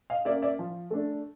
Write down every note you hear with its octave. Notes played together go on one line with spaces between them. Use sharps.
D#5 F5
A#3 C#4 D5 E5
D5 E5
F3
A3 D4